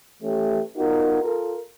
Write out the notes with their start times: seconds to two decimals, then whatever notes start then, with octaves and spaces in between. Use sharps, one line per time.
0.23 E3 A3 C#4 G4
0.76 B3 D#4 F4 F#4 A#4
1.22 F4 A4 A#4